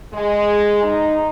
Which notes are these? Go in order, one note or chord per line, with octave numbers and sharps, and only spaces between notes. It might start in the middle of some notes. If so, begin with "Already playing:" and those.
G#3
D#4